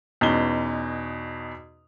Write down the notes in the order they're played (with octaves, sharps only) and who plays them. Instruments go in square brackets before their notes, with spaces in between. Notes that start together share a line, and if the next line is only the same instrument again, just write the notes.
[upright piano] E2 B2 C#4 D#4 G7